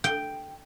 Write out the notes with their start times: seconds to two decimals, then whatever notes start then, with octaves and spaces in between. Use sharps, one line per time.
0.04 G5